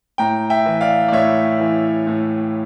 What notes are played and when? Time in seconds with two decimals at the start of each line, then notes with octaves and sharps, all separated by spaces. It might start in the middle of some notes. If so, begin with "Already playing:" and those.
0.18 A2 G5 A#5
0.50 E5 G5
0.66 E3
0.81 D5 F5
1.08 D5
1.12 A2 C#5 E5
1.60 E3
2.07 A2